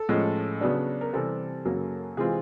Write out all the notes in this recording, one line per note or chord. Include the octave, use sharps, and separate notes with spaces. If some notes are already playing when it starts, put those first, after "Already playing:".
Already playing: A4
A2 F3 G#3 C#4
C#3 F#3 B3 D4
A#4
C3 E3 G3 C4 A4
F#2 C#3 F#3 A#3
C3 E3 G#3 C4 F4 G#4